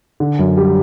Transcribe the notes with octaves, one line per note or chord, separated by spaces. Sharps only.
D3
F#2
G3